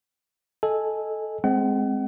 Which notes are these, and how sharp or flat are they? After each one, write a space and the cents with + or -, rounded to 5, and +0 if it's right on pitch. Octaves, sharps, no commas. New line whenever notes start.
A4 -10 D#5 +0 G#5 -10
G#3 +5 C4 +0 F#5 +35